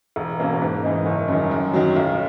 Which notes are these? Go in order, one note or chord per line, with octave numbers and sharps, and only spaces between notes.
E1
E2 B2 A#3 C#4
G#2
E3 G#3 D#4
F#1
F#2 D#3
F#2
D#3 F#3
B1